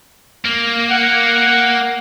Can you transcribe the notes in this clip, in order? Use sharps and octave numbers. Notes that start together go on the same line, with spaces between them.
A#3
F#5